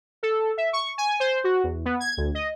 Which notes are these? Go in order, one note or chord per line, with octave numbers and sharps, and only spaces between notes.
A4
E5
C#6
G#5
C5
F#4
E2
B3
G#6
D2
D#5